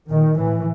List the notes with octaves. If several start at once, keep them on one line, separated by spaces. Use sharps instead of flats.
A#2 D#3
A2 E3